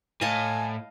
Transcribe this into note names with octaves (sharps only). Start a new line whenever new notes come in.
A2 D#5 F5 G#5 A5